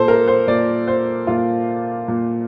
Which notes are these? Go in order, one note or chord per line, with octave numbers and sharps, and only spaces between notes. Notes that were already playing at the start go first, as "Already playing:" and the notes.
Already playing: A#2 A4 C5
A#4
C5
A#2 D5
C5
A#2 F4
A#2